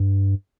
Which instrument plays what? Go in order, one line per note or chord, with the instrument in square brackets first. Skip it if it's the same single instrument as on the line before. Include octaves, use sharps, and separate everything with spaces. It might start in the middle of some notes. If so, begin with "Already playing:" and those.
Already playing: [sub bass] G2